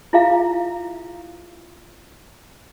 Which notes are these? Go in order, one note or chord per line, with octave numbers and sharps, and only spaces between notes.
E4 F4 G#4 E5 F5 A#5